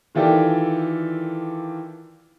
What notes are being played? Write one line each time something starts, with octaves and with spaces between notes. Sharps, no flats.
D#3 E3 F4 G4 A4 D5